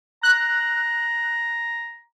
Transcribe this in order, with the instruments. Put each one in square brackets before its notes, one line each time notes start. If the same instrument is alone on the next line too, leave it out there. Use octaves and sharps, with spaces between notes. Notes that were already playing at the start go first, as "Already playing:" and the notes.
[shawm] A#5 [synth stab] F#6